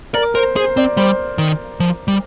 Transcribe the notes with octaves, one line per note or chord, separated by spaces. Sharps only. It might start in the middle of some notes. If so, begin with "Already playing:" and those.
A#4 D5
A#4 C5
G#4 C5
C4 D5
G3 C5
D#3
F3
G3